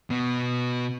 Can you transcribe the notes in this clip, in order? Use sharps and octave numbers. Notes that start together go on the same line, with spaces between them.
B2 B3